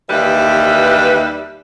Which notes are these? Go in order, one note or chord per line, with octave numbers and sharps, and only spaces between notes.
D#2 E3 G3 B4 E5